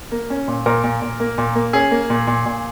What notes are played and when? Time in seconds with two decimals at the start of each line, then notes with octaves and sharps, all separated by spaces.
0.12 A#3
0.30 C#4
0.48 A#2
0.66 A#2 A#4
0.84 A#2
1.01 A#2
1.20 A#3
1.38 A#2
1.55 A#3
1.73 C#4 G#4
1.91 A#3
2.10 A#2
2.27 A#2
2.46 A#2